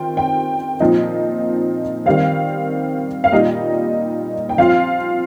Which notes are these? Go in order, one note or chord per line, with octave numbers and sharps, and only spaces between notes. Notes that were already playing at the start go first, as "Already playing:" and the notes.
Already playing: D#3 C4 F4 G5
G5
A#2 F3 C4 D#4
D#3 G3 C4 F5
F5
A#2 G3 D#4 D#5
G5
F3 C4 F4 F5